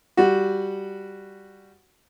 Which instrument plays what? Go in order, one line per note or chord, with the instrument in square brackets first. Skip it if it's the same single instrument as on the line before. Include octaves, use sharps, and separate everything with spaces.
[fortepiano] G3 F#4